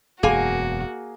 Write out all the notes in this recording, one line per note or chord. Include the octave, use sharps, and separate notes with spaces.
E1 F#2 A#3 F#4 G#4 G#5